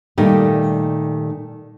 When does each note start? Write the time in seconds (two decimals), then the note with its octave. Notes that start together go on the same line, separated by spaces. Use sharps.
0.18 A#2 D#3 G3 A3 D#4 G4